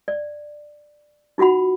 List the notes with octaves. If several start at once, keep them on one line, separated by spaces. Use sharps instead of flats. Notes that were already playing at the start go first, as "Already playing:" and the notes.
D5
D#4 F4 F#4 F#5 B5